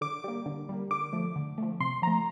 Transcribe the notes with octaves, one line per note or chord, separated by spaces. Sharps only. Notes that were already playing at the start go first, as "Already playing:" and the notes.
D3 D6
G3 A#3
D3
G3 A#3
D3 D6
F3 A3
D3
F3 A3
C3 C6
F3 A3 A#5